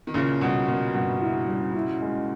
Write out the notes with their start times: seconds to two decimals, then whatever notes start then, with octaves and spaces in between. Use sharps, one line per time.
0.07 D#3
0.14 A#2 C#3 E4
0.41 B2 G3
0.67 A#2 B3
0.94 G2 B2
1.21 E4
1.48 G3
1.75 E4
2.01 G#3